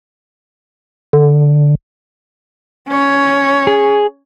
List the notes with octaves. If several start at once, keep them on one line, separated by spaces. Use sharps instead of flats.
D3
C#4 C#5
G#4